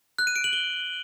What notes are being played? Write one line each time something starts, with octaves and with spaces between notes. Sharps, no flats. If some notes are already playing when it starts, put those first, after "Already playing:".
F#6
D#7
D7
F#7
G7